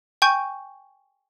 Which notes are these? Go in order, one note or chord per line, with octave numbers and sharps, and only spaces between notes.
G5 G#5 C#6 G6